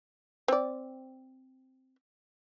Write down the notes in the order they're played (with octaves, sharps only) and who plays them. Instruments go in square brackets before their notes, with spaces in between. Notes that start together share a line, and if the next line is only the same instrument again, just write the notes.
[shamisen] C4 D5